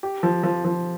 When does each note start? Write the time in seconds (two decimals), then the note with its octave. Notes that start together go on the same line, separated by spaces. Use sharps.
0.03 G4
0.23 F3
0.43 F3
0.64 F3